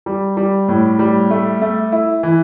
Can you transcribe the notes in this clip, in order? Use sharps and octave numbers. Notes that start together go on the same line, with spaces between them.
G3
G3
A2
G3
A3
A3
E4
E3